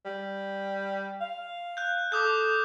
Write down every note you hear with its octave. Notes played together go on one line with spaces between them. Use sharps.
G3
F5
F#6 G6
A4 D6 D#6 G6